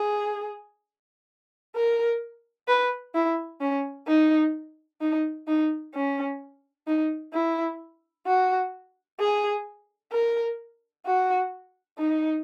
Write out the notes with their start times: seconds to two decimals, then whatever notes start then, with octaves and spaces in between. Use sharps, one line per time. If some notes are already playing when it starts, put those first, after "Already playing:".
Already playing: G#4
1.76 A#4
2.68 B4
3.14 E4
3.61 C#4
4.07 D#4
5.01 D#4
5.47 D#4
5.94 C#4
6.87 D#4
7.33 E4
8.27 F#4
9.19 G#4
10.12 A#4
11.06 F#4
11.98 D#4